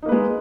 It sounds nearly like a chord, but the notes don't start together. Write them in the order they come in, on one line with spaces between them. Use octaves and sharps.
D#4 A#3 B4 G#3